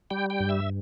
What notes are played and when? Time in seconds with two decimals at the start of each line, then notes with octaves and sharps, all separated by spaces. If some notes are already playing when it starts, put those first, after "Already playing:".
0.11 G3 G5
0.30 G5
0.40 G2
0.49 E5